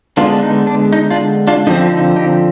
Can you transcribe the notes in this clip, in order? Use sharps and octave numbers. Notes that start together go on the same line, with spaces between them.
D3 G#3 B3 D4 F4
D4
D#4
D4
D#4
D4 F4
D4 F4
D3 F3 C4 D#4
D#4
D#4 G4